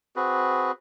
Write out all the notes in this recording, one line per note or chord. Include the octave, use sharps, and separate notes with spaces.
C4 F#4 G#4 B4